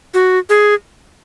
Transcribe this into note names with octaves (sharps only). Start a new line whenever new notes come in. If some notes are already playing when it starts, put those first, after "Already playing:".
F#4
G#4